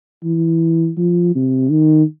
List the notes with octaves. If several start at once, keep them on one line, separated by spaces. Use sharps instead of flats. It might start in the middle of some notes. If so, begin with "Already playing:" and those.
E3
F3
C3
D#3